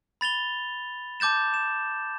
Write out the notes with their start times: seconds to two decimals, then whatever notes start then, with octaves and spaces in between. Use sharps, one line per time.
0.21 B5 A6 F7 G7
1.20 A5 D6 G6 A6 E7
1.54 E7